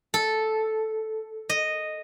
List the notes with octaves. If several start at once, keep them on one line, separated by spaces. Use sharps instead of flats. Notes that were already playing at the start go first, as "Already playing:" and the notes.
A4
D#5